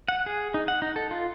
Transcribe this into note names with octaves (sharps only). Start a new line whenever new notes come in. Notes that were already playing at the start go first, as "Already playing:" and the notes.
F#5
G#4
D#4
F#5
D#4
A4
F4